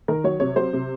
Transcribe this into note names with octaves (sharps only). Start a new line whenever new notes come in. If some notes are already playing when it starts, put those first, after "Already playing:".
D#3 A#4
F#3 C#5
C3 C#5
F#3 C5
C3